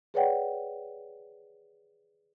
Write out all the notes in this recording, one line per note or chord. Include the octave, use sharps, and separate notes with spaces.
G#4 B4 C#5 D5 F#5 G5